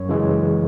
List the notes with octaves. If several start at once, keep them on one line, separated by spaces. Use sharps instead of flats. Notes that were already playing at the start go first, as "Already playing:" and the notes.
Already playing: F#2 C#5
C#3 E3 G#3